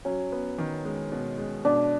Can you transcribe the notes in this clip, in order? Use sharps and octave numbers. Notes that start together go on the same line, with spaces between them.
F#3 C#4
B3
D#3
G#3
B2
G#3
B2 D4